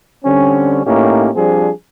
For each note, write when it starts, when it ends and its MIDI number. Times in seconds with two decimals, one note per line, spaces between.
0.24 0.83 50
0.24 0.83 55
0.24 0.83 60
0.24 0.83 61
0.85 1.29 45
0.85 1.29 58
0.85 1.29 61
0.85 1.29 63
0.85 1.29 67
1.34 1.70 53
1.34 1.70 55
1.34 1.70 60
1.34 1.70 62
1.34 1.70 68